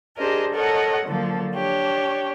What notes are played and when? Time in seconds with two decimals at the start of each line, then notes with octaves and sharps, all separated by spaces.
0.18 D4 G4 G#4 A#4 C5 D#5
0.54 A4 A#4 C#5 D#5 F#5
1.07 D3 F3 F#3 A#3 A4
1.54 D4 G4 C#5